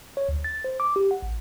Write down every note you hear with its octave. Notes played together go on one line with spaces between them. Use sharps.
C#5
D2
A6
C5
D6
G4
F#5
A1